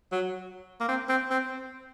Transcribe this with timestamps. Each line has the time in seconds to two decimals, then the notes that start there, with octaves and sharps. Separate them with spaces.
0.12 F#3
0.80 A#3
0.88 C4
1.09 C4
1.31 C4